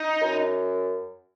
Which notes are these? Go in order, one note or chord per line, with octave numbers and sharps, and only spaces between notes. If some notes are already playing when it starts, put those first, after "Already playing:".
Already playing: D#4
F#2